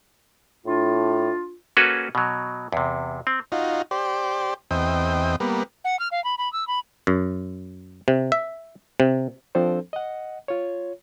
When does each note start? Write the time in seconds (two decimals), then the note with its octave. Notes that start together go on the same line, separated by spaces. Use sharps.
0.66 A2 D4 F4
1.77 A#3 C#4 F#4 G#4 A4 B4
2.15 B2 F#3
2.73 E2 C3
3.27 C4
3.52 D#4 F4 F#4
3.91 G4 C5 D5
4.71 E2 C4 D#5 G5
5.40 G3 A#3 B3
5.84 F#5
5.99 F6
6.11 F5
6.24 B5
6.38 B5
6.53 E6
6.67 B5
7.07 F#2
8.08 C3
8.32 E5
9.00 C3
9.55 F3 C4 D4 A4 C5
9.93 D#5 F#5
10.48 F4 C#5